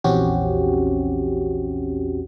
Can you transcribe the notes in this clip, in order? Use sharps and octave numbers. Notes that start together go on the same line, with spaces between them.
A#1 E2 C4 C#4 F#4 G4